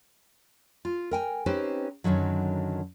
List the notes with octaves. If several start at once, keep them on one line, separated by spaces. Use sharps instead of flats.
F4
A#4 G5 G#5
C4 C#4 D#4 G4 B4 C5
F#2 A2 D3 D#3 F#3